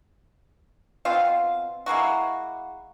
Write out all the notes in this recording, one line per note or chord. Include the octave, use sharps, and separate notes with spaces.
B2 C4 F4 F5
G#3 A#3 E4 F#4